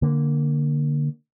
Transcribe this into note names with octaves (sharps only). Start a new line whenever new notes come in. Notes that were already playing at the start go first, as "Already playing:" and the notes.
D3 A#3